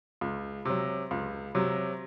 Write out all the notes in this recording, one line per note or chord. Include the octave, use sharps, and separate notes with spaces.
C#2
C3 F#3
C#2
C3 F#3